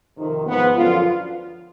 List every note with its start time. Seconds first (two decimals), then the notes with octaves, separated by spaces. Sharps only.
0.17 F2 C3 D#3
0.46 G#2 F3 B3
0.75 F#2 D3 F3 F4